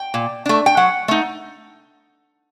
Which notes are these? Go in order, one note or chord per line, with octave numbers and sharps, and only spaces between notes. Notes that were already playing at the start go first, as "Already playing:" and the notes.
Already playing: G5
A#2
A3 D4
G5
F#3 F#5
A3 D#4